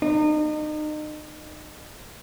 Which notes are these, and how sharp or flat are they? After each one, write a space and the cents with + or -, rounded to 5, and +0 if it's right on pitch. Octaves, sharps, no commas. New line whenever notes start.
D#4 -35